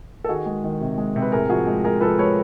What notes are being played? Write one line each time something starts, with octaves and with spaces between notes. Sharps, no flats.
A4
D#3 F#4 G#4
G#3
D#3
C3
G#3
C3
B4
A2 G#4 A#4
F3 F#4 G#4
G#3
G#3 G#4 A#4
F3 A4 B4
G#3 B4 C#5